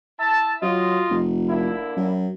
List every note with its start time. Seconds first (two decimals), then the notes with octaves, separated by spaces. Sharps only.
0.20 E4 E5 A5
0.63 F#3 F4 D#5
1.11 F1
1.49 D3 A#3 E4
1.97 F#2